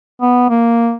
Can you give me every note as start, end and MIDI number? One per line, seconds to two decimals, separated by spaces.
0.21 0.49 59
0.49 0.94 58